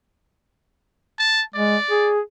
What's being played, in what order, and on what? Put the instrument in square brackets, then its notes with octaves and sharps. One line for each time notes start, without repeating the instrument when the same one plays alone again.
[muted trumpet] A5
[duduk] G#3 [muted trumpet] D5
[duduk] G#4